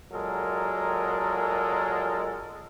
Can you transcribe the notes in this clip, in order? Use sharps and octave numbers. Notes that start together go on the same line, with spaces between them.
A#2 F#3 G#3 A4 A#4